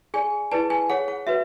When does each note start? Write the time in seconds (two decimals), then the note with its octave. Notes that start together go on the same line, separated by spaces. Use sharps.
0.14 G#4 D5 G#5
0.52 E4 G#4 B4 D5 A5
0.70 G#5
0.90 G#4 C#5 F#5
1.08 F#5
1.27 F#4 B4 E5